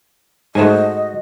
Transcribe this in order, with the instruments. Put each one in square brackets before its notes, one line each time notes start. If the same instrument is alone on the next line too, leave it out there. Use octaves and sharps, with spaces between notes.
[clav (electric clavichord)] G#2 A3 [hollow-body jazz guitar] F#4 C5 G#5 [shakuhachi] D#5